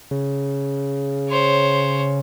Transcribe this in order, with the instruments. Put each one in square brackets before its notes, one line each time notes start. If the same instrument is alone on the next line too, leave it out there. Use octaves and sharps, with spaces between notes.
[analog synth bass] C#3
[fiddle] C5 C#5